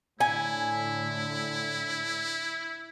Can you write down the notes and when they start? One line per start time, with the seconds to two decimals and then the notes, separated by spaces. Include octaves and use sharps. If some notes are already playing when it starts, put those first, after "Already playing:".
0.20 A2 D3 E4 G#5